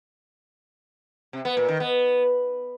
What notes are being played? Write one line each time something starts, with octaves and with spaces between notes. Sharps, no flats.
C3
B3
A#2
D#3
B3